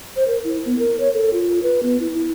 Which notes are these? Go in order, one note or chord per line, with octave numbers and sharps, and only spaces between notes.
C5
A#4
E4
B3
A#4
C#5
A4
F4
B4
B3
E4
E4